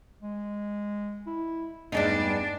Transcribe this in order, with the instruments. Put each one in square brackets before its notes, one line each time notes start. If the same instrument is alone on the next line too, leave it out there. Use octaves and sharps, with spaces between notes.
[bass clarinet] G#3
E4
[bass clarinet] E2 [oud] G2 G#3 D#4 [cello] D4